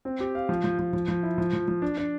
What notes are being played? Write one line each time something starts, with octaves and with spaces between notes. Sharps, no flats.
C4
G4
F5
F3
F3
F3
F3
F3
E4
F3
F3
F3
D4
D4